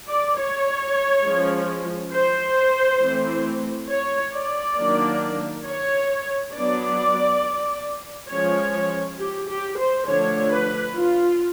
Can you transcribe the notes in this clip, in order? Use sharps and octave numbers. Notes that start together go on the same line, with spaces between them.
D5
C#5
F3 G#3 C#4
C5
E3 A3 C4
C#5
D5
D#3 F#3 A#3 D4
C#5
F#3 B3 D4 D5
F3 G#3 C#4 C#5
G4
G4
C5
D3 F3 A3 D4 C#5
B4
F4